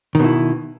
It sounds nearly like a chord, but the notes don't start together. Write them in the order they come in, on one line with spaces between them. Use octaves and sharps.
D#3 B2 E4